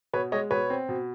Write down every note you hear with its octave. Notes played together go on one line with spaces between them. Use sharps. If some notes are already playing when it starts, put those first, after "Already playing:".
B2 B4 C#5
G#3 C#5 D#5
B2 B4 C#5
C4
B2